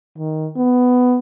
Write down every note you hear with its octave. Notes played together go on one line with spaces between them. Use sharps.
D#3
B3